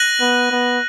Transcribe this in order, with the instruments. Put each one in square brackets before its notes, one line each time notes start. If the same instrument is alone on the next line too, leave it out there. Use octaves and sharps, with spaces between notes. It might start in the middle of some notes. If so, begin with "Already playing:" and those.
Already playing: [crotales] F#6 A#6 D#7 F#7
[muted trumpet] B3
B3